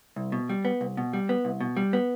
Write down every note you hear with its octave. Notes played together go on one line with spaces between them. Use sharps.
C2
B2
G3
B3
C2
B2
G3
B3
C2
B2
G3
B3